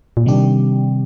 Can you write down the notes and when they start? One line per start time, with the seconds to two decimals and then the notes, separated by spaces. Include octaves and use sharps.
0.17 A#2
0.26 C3 D#3 G3 D4 G4